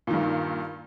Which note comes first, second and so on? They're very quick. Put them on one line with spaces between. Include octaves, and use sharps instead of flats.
A#2 D#3 G2